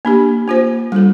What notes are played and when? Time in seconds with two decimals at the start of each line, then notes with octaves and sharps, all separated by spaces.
0.05 A#3 D4 G4
0.48 A#3 F4 C5
0.92 G3 D4 F4 A4